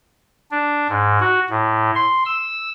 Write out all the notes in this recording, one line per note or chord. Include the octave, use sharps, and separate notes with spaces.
D4
G#2
F#4
A2
C6
E6